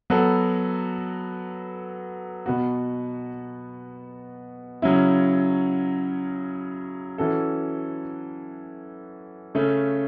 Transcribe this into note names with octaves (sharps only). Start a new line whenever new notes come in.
F#3 B3 F#4 A4
B2 B3 F#4
C#3 F#3 C#4 E4
E3 C#4 F#4 A4
C#3 A3 C#4